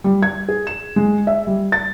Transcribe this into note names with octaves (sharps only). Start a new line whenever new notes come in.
G3
G#6
G#4
E7
G#3
E5
G3
A6